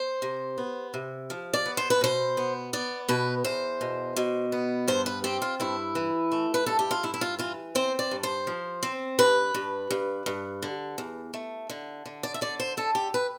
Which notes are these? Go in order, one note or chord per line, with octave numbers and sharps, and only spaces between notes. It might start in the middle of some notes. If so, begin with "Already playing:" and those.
Already playing: C5
C3
B3
C3
F3
D5
B3
C5
B4
B2 C5
B3
B3 D5
B2 B4
E2 C5
B2
B2
B3
G2 C5
B4
C4 G4
F4
G2 E4
E3
A3
B4
G2 A4
G4
F4
G2 E4
E4
F4
E3 F4
C4 C5
D5
G2
C5
F3
C4
G2 B4
G2
G2
G2
D3
E2
A3
D3
D3
D5
E5
D3 D5
C5
D3 A4
G4
B4